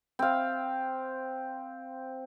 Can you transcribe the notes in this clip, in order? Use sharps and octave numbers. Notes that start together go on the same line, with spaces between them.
C4 F5